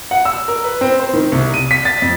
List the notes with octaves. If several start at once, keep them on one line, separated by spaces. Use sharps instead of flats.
F#5
E6
A#4
B4
C4
C5
D#3
C2
D#7
B6
A6
F2